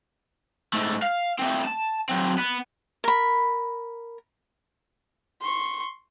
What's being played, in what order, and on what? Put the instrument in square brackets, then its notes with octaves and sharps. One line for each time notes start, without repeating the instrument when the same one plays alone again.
[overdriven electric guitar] G#2 A3
F5
A3 C4
A5
F#3 C4
B3
[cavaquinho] A#4 B5
[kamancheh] C6 C#6